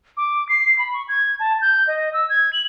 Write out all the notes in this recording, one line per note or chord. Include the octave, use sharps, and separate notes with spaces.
D6
C7
B5
C#6
G#6
A5
G6
D#5
E6
G#6
F#7